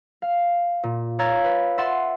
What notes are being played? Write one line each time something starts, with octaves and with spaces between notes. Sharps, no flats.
F5
A#2
C#5 F5 A#5 E6 G#6 A6
B4
E5 F#5 C6 A6 E7